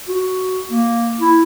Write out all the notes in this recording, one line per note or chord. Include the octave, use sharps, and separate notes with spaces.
F#4
A#3
E4